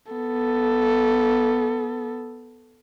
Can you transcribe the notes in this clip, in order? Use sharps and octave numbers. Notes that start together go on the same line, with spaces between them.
B3 A4